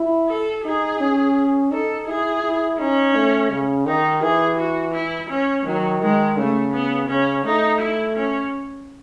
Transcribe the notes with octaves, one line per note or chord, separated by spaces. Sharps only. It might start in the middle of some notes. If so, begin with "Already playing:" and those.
Already playing: E4
A4
D#4 G#4
C#4
D#4 A4
E4 G#4
E4
C#4 D#4
A3
C#3
D#3 D#4
E3 G#4
F#4
E4
C#4
D#3 F#3
D#3 G#3
C#3 A3
B3
C#3 C#4
A3 D#4
E4
C#4